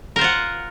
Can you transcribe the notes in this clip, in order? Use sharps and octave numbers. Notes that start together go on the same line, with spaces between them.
F4 A#4 C5 F#5